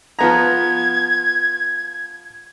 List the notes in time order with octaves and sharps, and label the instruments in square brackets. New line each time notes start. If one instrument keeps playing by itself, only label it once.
[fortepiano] F3 B3 A#5 [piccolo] G#6